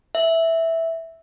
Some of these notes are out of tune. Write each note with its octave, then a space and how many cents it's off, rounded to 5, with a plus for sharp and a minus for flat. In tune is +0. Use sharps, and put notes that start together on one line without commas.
E5 -5